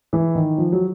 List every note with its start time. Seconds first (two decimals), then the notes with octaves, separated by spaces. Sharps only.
0.13 E3
0.35 D#3
0.58 F3
0.72 F#3